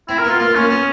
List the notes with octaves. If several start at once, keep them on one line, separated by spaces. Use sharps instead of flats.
C4 E4
A#4
B3 F4
A#3 F4
A#3 C#4
B3